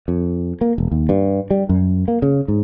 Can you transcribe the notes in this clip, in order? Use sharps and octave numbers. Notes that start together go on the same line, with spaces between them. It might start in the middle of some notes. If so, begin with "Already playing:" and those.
F2
A#3
E1
D#2
G2
G3
F#2
A#3
C#3
G#2